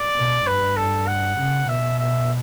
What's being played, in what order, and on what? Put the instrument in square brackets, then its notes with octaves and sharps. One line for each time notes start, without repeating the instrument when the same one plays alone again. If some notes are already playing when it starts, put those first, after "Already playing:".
Already playing: [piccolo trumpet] D5
[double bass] B2
[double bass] G2 [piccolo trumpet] B4
[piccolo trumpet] A4
F#5
[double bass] C#3
[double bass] B2 [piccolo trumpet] E5
[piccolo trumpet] E5